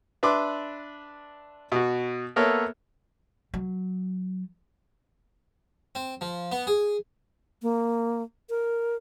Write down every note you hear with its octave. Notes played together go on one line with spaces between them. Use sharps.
D4 B4 E5 C6 D6
B2 F#4
A#3 B3 A4 A#4 C#5 E5
F#3
C4
F3
B3
G#4
A#3
A#4